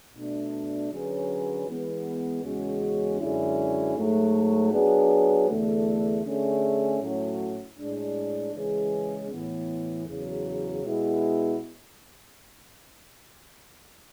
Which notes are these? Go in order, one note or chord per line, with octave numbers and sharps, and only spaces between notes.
B2 A3 D4
D3 F#3 C#4 G#4 B4
E3 G#3 B3
E2 C#3 G#3 C#4 F#4
F#2 D3 G#3 C#4 E4
G#2 F#3 A3
F#3 B3 D4 G#4
E2 D3 A3
D3 A3 C#4 G#4
A2 F#3 A3 C#4 F#4
A2 G#3 D4
C#3 E3 G#3 C#4 G#4
A2 E3 B3
E2 C#3 F#3
B2 G#3 B3 E4